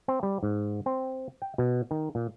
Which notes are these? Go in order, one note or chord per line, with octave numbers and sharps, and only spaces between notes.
C4
G3
G#2
C4
G5
B2
D#3
A#2